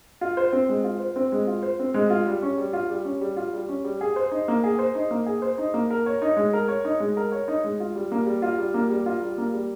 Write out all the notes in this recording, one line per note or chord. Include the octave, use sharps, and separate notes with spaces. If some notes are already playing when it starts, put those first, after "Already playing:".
F4
C5
C4
G#3
F4
C5
C4
G#3
F4
C5
C4
G#3
F4
G3
C#4
G3
F4
G3
C#4
G3
F4
G3
C#4
G3
G#4
C5
D#4
A#3
G#4
C5
D#4
A#3
G#4
C5
D#4
A#3
A#4
C#5
D#4
G#3
A#4
C#5
D#4
G#3
A#4
C#5
D#4
G#3
F4
G3
A#3
G3
F4
G3
A#3
G3
F4
G3
A#3
G3